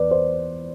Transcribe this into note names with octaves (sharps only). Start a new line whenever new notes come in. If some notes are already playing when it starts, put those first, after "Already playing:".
Already playing: E2 B4 D5
C5